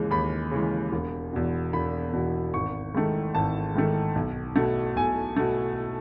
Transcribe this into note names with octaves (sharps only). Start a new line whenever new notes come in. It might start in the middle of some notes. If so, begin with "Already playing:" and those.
Already playing: D#2 C#3 E3 G#3
D#2 B5
C#3 E3 G#3
E1
E2 B2
E1 B5
E2 B2
G#1 C#6
G#2 D#3 A3
G#1 A5
G#2 D#3 A3
B1
B2 A3
B1 G#5
B2 A3